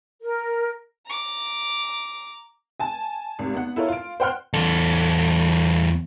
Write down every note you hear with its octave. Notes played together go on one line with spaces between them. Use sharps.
A#4
A#5 D6
G#5 A5
G#1 C3
B3 F#5
E4 F4 A4 A#4 C#5
F4 D7
C5 F#5 G5 C6 F6 F#6
E2 A4